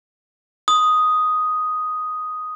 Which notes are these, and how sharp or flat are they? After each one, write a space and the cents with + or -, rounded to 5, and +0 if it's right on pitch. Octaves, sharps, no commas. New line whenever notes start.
C6 +0 D#6 +0